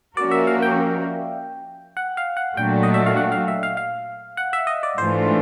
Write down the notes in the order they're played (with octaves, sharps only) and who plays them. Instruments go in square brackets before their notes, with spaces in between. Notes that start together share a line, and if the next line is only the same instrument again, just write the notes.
[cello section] F3 A#3 C#4 F#4 A#4 [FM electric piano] D5
[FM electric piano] E5
F5
G5
F#5
F5
F#5
[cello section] A#2 F#3 A3 D4 F#4 [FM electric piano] G5
[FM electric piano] D#5
E5
F5
F#5
F5
E5
F5
F5
F#5
E5
D#5
D5
[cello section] G#2 E3 A3 D4 F4 [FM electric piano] C5